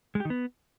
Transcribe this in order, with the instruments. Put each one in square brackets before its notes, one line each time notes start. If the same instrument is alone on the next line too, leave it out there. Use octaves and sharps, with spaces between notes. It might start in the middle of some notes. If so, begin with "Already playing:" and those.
[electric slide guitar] G#3
G4
D#3
B3